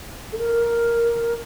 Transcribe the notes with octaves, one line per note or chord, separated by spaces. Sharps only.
A4
A#4